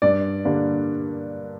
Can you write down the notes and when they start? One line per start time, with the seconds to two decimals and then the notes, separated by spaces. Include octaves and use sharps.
0.02 G2 D5
0.45 D3 G3 A#3 D4